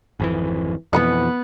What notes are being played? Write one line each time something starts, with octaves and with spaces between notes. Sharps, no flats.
G#1 F2 E3
F2 B2 E3 B3 B4 F#5